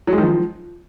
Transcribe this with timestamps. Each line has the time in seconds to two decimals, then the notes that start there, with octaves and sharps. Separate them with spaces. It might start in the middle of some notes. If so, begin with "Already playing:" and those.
0.07 F#3
0.13 G#3
0.18 D#3
0.23 F3